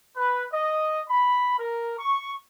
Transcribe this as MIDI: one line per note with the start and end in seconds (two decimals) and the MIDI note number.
0.16 0.44 71
0.52 1.01 75
1.09 1.58 83
1.59 1.93 70
1.99 2.34 85